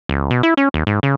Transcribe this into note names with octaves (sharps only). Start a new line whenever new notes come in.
C#2
B2
E4
C#4
D#2
G#2
C#3